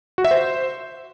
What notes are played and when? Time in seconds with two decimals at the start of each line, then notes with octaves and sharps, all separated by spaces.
0.18 F#4
0.25 E5
0.31 C5